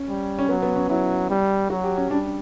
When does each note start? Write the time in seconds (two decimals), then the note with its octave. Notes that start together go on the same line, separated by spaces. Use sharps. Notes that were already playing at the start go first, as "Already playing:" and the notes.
Already playing: C#4
0.08 G3
0.39 C#4
0.49 F#3 B3
0.62 B3
0.76 C#4
0.89 F#3 E4
1.30 G3
1.70 F#3 F#4
1.83 G4
1.97 C#4
2.10 G3 D4